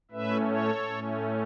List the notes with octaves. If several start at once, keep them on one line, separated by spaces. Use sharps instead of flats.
A2 A3 C#4 B4 E5
A4 C#5
A2 A3 C#4